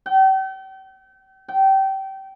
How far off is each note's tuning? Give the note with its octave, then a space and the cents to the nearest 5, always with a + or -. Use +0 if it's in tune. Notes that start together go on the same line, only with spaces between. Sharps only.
G5 -40
G5 -25